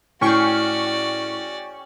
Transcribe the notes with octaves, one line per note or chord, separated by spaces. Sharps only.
A2 C#4 F#4 G#4 D5 G5 C#6